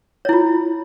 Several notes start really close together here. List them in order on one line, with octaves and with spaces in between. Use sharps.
C#5 E4 F4